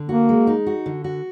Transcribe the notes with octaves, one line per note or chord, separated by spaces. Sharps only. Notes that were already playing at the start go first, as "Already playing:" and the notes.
Already playing: D3
A#3 F#4
G#3
D#4
F#4
D3
F#4